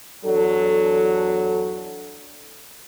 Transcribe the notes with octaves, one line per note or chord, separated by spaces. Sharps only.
E2 F#3 D4 A4